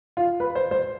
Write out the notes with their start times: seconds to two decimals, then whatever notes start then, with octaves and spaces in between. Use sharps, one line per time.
0.17 F4
0.40 B4
0.55 C5
0.71 C5